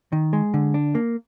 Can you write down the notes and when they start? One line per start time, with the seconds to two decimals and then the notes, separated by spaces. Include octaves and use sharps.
0.12 D#3
0.33 G#3
0.54 D3
0.74 D4
0.95 A#3